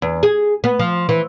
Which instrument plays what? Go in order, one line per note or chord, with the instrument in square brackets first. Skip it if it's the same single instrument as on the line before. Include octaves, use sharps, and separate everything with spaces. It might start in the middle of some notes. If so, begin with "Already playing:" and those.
[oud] E2
G#4
B3
F3
E3